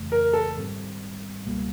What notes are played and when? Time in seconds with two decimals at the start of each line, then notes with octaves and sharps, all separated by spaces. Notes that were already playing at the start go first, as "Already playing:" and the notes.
Already playing: F2 C#3 E3 A3
0.12 A#4
0.33 A4
0.56 G#2 D#3 G3 C4
1.45 C#2 B2 G3 A#3